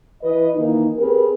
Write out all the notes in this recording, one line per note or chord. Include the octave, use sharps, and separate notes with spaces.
E3 B4 D#5
D#3 E3 A#3 D#4
C4 G4 G#4 A#4 B4